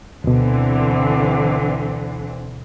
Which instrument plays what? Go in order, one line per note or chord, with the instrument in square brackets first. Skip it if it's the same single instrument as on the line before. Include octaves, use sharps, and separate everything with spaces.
[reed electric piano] D2 B2 [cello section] D3 E3 C4